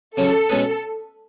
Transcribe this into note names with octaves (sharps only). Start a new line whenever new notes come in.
C#3 F#3 C#4 A4
B2 G#3 C#4 G#4 B4